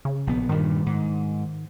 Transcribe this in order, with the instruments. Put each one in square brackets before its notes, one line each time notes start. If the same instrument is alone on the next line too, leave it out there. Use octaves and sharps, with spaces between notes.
[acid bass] C#3
[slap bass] A#1 B3
[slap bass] G2 A#2 G3 [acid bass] D#3
[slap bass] G#2